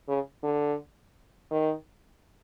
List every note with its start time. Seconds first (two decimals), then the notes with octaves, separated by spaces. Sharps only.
0.08 C#3
0.43 D3
1.51 D#3